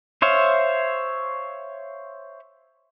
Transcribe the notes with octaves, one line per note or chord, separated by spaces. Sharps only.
C5 C#5 E5 F5